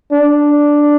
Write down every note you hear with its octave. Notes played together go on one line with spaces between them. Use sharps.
D4